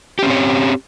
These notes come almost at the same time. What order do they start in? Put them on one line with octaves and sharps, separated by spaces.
G4 C#4 C4 C#5